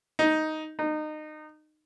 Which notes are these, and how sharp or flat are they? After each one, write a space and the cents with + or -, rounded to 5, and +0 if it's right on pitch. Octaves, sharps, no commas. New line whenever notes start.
D#4 +5
D#4 -25